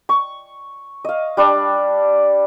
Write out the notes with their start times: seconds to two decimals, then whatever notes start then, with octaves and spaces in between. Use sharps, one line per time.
0.09 C#6
1.05 D#5 F5
1.37 G3 D4 D5